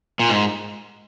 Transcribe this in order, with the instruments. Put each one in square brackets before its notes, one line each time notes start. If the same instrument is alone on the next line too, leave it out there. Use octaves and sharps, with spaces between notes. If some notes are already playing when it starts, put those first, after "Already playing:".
[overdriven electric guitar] A#2
G#2